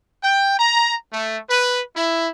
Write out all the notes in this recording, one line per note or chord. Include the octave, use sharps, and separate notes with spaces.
G5
A#5
A3
B4
E4